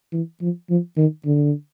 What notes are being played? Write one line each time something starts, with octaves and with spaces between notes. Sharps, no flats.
E3
F3
F3
D#3
D3